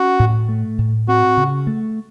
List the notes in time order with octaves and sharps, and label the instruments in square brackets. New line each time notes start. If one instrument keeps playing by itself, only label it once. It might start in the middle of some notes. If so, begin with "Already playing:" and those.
Already playing: [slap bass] C#4 [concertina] F#4
[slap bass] A2
A3
A2
[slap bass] C4 [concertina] F#4
[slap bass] C#3
A3